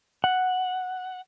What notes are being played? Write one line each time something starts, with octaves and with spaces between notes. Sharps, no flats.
F#5